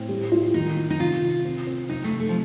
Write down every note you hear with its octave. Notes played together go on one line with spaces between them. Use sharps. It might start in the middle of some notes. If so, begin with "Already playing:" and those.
Already playing: A2 C4
G3
F4
D#3 D#4
D#3
D#4
C3 F4
C3
C4
C4
C3 D#4
A3
C3
A3
F3